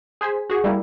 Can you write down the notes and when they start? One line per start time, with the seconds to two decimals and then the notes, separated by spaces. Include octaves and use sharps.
0.21 G#4 C5 G#5 B6
0.50 F#4 G#4 C#6
0.64 G3 A3 A#3 E4